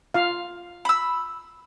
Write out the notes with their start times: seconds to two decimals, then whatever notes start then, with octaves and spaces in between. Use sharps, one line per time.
0.14 F4 F5
0.85 B5 E6